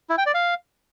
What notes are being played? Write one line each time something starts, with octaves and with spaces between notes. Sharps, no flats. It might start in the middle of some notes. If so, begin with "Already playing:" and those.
E4
G5
D5
F5